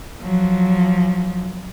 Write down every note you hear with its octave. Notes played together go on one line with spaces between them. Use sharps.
F3 F#3